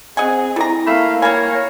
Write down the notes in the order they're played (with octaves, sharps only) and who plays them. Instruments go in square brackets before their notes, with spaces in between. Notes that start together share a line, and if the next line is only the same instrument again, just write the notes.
[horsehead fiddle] C4 G#4 [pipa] D#5 F#5 G#5
[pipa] G3 A#5 [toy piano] E4 A4
[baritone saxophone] A3 [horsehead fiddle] A#3 F5 [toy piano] B5
[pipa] G3 G#5 [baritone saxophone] A#3 [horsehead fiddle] C#5 [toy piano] B5